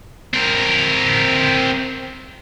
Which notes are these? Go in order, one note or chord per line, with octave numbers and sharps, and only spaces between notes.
C4 A#4